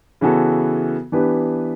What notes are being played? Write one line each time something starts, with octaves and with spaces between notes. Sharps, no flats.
C#3 E3 B3 F#4 A4
E3 B3 D4 G4 B4